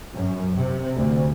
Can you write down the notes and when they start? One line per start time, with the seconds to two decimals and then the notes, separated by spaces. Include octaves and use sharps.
0.12 F#2
0.53 C3
0.96 D2